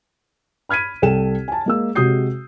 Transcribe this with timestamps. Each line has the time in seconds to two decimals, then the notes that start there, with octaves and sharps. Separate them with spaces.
0.69 B5 F6 G#6 B6 D#7
1.02 C2 A4 G5 E7
1.48 G#5 A5
1.66 G#3 A#3 E6
1.95 C3 G#3 F#4 D#6 G6 C7